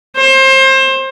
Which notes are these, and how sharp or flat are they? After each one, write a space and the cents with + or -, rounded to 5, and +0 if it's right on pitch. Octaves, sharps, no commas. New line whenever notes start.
C5 +25